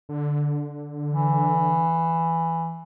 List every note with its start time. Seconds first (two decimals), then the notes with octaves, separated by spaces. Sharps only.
0.09 D3
1.11 E3